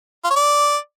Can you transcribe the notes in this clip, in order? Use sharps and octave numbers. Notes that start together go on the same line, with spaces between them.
F4
C#5
D5